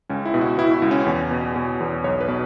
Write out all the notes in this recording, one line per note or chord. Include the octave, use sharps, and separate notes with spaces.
C#2 C#4
E4
B2
F#4
B2 E4
E4
C#2
C#4
E2
B2
B2
E2
B1 C#5
B4
B2